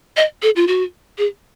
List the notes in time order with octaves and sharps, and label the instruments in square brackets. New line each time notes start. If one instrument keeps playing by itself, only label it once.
[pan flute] D#5
A4
F4
F#4
G#4